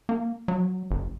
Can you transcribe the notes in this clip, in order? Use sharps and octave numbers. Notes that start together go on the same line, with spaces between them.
A#3
F#3
F#1